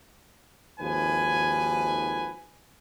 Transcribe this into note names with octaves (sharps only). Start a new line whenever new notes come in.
G#1 D#2 F3 B4 G#5